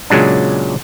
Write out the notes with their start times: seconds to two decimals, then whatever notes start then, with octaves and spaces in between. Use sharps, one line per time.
0.10 A#2 C#3 F#3 G#3 D4